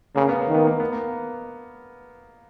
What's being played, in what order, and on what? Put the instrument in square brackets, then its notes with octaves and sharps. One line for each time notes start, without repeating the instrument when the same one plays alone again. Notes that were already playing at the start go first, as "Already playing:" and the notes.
[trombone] C#3 [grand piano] A#3
[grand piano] B3
A#3
[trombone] D#3
[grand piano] B3
A#3
B3
A#3